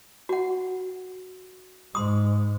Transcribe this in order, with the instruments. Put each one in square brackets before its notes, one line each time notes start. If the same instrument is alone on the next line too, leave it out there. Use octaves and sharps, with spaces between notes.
[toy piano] F#4 F#5
[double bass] G#2 [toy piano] C6 D#6